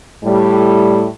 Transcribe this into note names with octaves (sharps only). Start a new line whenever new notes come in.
A2 G3